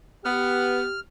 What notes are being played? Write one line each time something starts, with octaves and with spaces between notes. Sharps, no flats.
B3 G4 F6